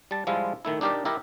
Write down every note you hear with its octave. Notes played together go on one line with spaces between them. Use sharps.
G3 A5
F3 G3 G#3 E4 F4
D#3 A3 E4
D4 D#4 G4 A#4 D5
E4 G4 A#4 D#5